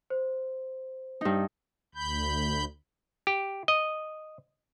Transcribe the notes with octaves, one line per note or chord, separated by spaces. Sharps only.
C5
G2 D#4
D2 B5 G6
G4
D#5